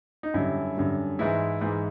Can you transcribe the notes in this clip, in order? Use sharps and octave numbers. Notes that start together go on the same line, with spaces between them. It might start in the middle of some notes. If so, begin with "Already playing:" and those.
D#4
F#2 D3 G3 E4
F#2 D3 G3
G#2 E3 G#3 E4
G#2 E3 G#3